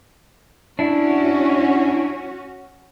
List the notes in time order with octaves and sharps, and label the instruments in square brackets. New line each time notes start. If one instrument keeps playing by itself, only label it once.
[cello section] C#4 F#4 [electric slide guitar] D4 E4